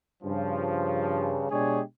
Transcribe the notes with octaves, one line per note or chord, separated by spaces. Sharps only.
G2 C#3 F3
B2 G#3 D4 G4 G#4 C#5